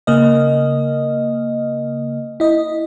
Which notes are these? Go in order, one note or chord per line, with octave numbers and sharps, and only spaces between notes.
C#3 A#3 D#5
E4 D#5